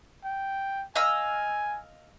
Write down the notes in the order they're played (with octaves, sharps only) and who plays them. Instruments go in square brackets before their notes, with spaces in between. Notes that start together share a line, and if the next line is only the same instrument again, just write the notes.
[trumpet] G5
[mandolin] D#5 F5 E6 [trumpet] G#5